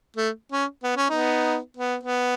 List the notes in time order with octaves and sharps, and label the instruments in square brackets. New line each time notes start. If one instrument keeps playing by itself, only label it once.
[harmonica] A3
C#4
B3
C#4
B3 D#4
B3
B3